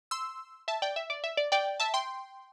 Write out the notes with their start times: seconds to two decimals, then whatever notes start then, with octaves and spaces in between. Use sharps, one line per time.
0.11 C6 E6
0.68 E5 A5
0.82 D5 G5
0.96 E5
1.10 D5
1.24 E5
1.37 D5
1.52 D5 G5
1.80 E5 A5
1.94 G5 C6